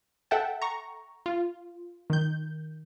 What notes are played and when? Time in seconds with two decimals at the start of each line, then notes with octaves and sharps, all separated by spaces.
0.31 A4 E5 F#5 G5 A5
0.62 A#5 C#6
1.26 F4
2.10 D#3 G6